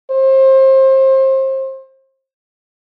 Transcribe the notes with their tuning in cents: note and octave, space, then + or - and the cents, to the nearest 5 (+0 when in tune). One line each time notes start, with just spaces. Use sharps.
C5 +30